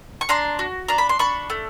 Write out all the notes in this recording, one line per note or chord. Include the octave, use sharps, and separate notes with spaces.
C#6
D4 A#5 C6
F#4
D4 A#5
B5
C6
D4 B5 C#6
A3